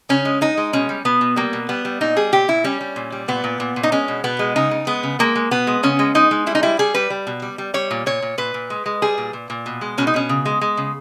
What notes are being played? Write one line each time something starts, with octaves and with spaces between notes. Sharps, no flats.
C#3 C#4
G#3
G#3 D#4
G#3
B2 C#4
G3
B2 B3
B2
G3 A#3
B2
G3 B3
G3
A#2 D#4
G3 G#4
A#2 G4
A#2 E4
G3 C#4
G3
A#2
G3
A#2 B3
A#2
A#2
A#2
D#4
G#3 C#4
B2
B2 B3
G#3
C#3 D#4
C#3
G#3 B3
C#3
G#3 A#3
G#3
B2 B3
G#3
C#3 C#4
G#3
G#3 D#4
G#3
G3 E4
D#4
G3 E4
G3 G#4
G3 B4
G3
B2
G3
G3
G3 C#5
A#2
A#2 C#5
A#2
A#2 B4
A#2
G#3
G#3
G3 G#4
A#2
A#2
A#2
B2
G#3
B2 C#4
D#4
B2 C#4
C#3
G#3
G#3
C#3